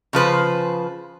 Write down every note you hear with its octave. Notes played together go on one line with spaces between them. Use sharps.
C#3 F3 B4 C5